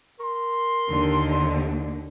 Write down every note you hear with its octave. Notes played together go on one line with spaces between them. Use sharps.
A#4 C6
D#2 D3